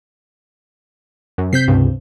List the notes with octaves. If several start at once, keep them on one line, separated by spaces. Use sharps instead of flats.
F#2
C3 C4 G6 B6 C7
C#2 G2